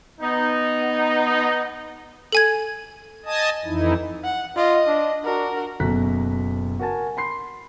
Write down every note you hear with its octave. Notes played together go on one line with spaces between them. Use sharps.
B3 D#4
A4 G#5 G#6
D#5 G#5 A5 D#6
F2 E3 D#4 E4
F#5
F4 D#5
D4
D4 F#4 A#4
F#1 B2 A4 A#5 F#6 B6
F#4 A#4 G#5 A5
B5 C6 C7